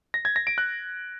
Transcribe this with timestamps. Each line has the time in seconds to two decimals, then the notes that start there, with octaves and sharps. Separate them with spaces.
0.14 A#6
0.25 G#6
0.36 A#6
0.47 D7
0.58 F#6